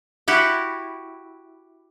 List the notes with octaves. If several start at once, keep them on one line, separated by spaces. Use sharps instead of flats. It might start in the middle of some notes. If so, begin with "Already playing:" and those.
E4 F#4 G4